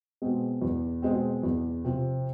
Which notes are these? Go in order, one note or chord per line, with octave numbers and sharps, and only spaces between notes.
B2 G#3 C4
E2
B2 G#3 C4
E2
C3 F3